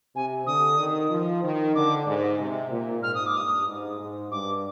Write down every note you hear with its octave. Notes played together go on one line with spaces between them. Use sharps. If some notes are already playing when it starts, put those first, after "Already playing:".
C3 G#5
D3 D#6
D#3
F3
D#3
D3 D6
G#2
C3
A#2
G#2 F6
D#6
D6
G2 D#6
G#2
G#2
G2 D6